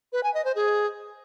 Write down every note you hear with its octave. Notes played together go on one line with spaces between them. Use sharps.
B4
G#5
D#5
C5
G#4